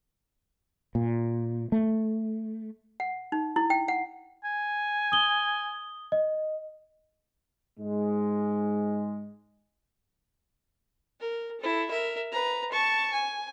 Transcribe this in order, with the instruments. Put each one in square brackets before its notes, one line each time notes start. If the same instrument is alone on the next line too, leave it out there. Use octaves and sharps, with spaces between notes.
[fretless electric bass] A#2
A3
[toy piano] F#5
D#4
E4
G5
F#5
[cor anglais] G#5
[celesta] D#6 G7
D#5
[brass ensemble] G#2 G#3
[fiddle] A#4
E4 A4
A#4 E5
B4 A#5
A5 C#6
G#5